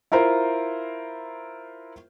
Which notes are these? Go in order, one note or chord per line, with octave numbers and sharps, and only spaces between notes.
E4 F4 A#4 C5